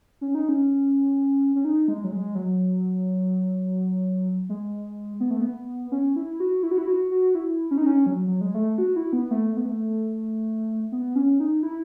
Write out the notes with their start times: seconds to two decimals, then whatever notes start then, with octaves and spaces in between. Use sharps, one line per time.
0.21 C#4
0.35 D#4
0.49 C#4
1.55 C#4
1.65 D#4
1.88 G#3
2.04 F#3
2.12 G#3
2.35 F#3
4.49 G#3
5.20 B3
5.31 A3
5.41 B3
5.92 C#4
6.16 E4
6.40 F#4
6.63 E4
6.71 F#4
6.78 E4
6.87 F#4
7.11 F#4
7.35 E4
7.71 C#4
7.78 D#4
7.86 C#4
8.06 F#3
8.27 F#3
8.41 G#3
8.54 A3
8.78 F#4
8.96 E4
9.13 B3
9.31 A3
9.49 A3
9.57 B3
9.65 A3
10.92 B3
11.16 C#4
11.40 D#4
11.63 E4